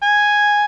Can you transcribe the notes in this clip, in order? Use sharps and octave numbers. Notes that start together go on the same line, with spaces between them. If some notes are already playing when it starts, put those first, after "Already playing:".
G#5